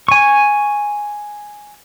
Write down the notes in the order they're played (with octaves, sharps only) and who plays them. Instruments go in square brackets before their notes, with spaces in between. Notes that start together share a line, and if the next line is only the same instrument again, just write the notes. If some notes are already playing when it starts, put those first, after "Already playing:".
[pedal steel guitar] G#5 C#6